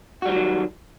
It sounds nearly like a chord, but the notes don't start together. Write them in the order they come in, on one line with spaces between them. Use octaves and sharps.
F#4 G3 E3 F#3 D#3